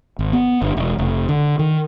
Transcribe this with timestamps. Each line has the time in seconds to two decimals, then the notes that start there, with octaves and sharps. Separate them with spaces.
0.19 G#1
0.33 B3
0.62 G1
0.77 E1
0.98 F1
1.29 D3
1.59 D#3